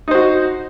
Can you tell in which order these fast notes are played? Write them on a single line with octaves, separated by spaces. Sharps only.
D#4 C5 F#4